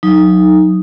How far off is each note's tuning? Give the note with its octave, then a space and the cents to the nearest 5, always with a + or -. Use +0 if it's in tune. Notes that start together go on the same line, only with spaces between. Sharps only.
F#3 -15 D#4 +0